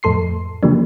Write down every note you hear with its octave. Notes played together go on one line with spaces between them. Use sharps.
F2 A2 A4 C6 C7
C#3 E3 F3 G3 A#3 D4